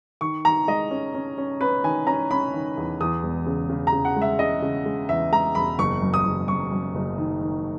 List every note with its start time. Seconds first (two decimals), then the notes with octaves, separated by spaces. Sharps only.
0.21 D#3 C#6
0.45 D#3 A#5
0.68 G#3 D#5
0.91 C#4
1.14 C#4
1.38 C#4
1.61 C#4 B4
1.84 D#3 G#5
2.07 C#4 A#5
2.31 C#4 B5
2.54 D#3
2.77 E2
3.00 E2 D#6
3.23 E1
3.46 C#3
3.69 C#3
3.87 A#5
3.92 C#3
4.05 F#5
4.16 G#3
4.22 E5
4.39 C#3 D#5
4.62 C#3
4.86 G#3
5.09 E2 E5
5.32 G#3 A#5
5.55 E1 B5
5.79 F#1 C#6
6.02 F#2
6.14 D#6
6.25 F#1
6.48 F#2 C#6
6.71 F#2
6.95 F#1
7.18 D#3
7.41 D#3